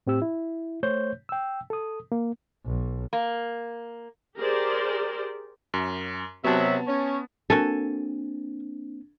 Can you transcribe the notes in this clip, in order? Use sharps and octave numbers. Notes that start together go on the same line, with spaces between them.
A2 C4 G4 E6
E4
A3 C5 C#5 G6
G5 E6
A4 D#6
A#3
B1
A#3
G4 G#4 A#4 C5 D5
F#2
C3 F#3 B3 E5 A5
C#4
A#3 C4 D4 F#4 A4 A#4 G#5